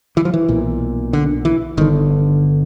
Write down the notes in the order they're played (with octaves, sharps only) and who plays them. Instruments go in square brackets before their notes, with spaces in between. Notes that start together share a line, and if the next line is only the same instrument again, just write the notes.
[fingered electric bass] E3
F3
E3
B1 A#2
D3
E3
G1 D3 D#3